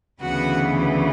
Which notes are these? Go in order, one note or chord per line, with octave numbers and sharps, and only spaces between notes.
D2 C#3 E3 B3 F#4 F#5